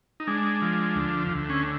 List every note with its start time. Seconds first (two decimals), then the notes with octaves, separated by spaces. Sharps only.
0.20 D#4
0.27 G#3 D4
0.62 F3
0.95 D2
1.29 D2
1.50 C#4